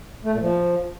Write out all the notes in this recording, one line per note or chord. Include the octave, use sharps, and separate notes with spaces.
A3
A#2
F3